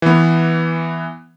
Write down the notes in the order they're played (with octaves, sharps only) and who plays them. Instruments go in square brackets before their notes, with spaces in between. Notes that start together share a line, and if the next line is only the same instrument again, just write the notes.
[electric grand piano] E3 B3